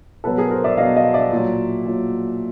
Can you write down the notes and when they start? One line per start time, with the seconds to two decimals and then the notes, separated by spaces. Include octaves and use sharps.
0.24 B2 F#3 A4 B4
0.38 G#4 A#4
0.50 A#4 C5
0.64 D5 E5
0.77 B2 F#3 D#5 F5
0.96 D#5 F5
1.14 D5 E5
1.31 A#2
1.37 F#3
1.85 A#2 F#3